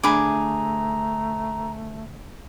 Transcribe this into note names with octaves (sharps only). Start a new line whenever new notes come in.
D2 A3 D4 G#4 A#5 B5 D6